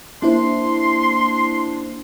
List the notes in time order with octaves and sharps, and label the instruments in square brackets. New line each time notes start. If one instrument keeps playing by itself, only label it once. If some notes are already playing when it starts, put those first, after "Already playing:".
[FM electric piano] A#3 E4 C5 [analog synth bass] D4 [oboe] C6